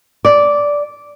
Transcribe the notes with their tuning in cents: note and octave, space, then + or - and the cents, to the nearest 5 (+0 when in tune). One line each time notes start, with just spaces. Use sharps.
D5 -10